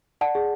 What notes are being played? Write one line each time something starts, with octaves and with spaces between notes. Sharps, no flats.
D5 F#5 A5
G#4